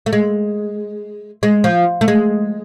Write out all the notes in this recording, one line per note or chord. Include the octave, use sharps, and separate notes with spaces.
A3
G#3
G#3
F3
A3
G#3